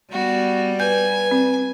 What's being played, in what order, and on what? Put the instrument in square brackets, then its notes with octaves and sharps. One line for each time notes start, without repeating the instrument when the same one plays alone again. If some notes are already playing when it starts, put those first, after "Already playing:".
[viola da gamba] G3 [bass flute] B3 [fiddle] F#4
[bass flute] B4 [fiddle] G#5 [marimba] G6
[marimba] C4